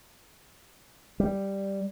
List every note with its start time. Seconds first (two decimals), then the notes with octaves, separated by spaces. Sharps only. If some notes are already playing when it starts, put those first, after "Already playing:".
1.20 G3